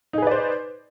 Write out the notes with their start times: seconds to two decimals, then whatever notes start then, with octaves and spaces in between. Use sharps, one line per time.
0.13 D#4
0.18 G#4
0.22 B4
0.27 D5
0.31 C5